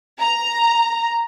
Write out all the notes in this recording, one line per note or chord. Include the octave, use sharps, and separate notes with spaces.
A#5